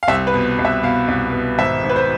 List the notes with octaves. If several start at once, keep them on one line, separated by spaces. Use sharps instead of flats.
F5
C2 E5
B4
B2
C2
E5
B2 F5
C2
B2
G#1 E5
G#1
B4
C5